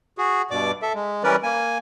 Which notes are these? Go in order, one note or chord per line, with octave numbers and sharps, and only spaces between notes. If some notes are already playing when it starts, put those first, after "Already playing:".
F#4 G#4
G2 B2 D5 D6
A4 E5
G#3
E3 G3 C#4 A#4 B4 D5
A#3 G#5